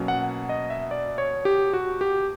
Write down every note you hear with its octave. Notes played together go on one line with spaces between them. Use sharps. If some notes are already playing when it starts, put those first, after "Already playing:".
Already playing: B2 F#3 A#3 C#4
F#5
D#5
E5
D5
C#5
G4
F#4
G4